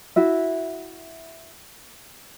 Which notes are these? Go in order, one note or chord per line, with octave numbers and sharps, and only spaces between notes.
E4 F#4 E5